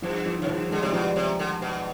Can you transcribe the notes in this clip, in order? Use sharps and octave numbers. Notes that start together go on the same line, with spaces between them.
G2 F3
F3
F2 D#3
G2 F3
D3 G#3
C3 G3
B2 F3
G3
C3
D3
B2